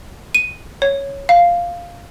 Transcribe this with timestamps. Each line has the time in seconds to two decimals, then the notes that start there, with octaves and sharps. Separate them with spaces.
0.35 D#7
0.82 C#5
1.29 F5